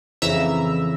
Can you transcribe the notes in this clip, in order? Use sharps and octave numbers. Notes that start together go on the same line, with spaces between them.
F2 C#3 E3 E5 A#5 E6